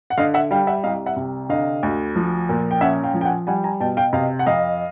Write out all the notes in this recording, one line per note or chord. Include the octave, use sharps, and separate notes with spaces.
F#5
D3 D#5 F5
E5 F#5
G3 F5 G5
E5 F#5
C2 D#5 F5
E5 F#5
C3
D3 D#5 F5
D2
F3
A#2
G5
C#4 E5 F#5
F5 G5
F3
G5
F#5 G#5
G3 F#5 G#5
G#5 A#5
B2 G5 A5
F5 G5
C3 D#5 F5
F#5
F2 D#5 F5